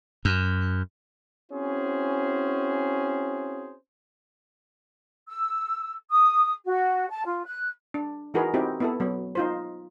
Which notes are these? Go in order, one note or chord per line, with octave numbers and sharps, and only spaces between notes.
F#2
C4 C#4 E4 F#4 G#4 C5
E6
D#6
F#4
A5
F4
F#6
D4
E3 D#4 F#4 G#4 A#4 B4
C4 D#4 E4 F#4 G4
B3 E4 A4
F#3 B3
D#4 F4 C5